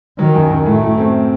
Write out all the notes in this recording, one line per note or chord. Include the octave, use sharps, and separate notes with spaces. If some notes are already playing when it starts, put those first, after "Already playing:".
D#3 F#3
F#2
F#2
A2 A3
A2
C4